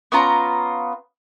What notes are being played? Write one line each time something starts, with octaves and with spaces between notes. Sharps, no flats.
B3 C#4 F4 A#5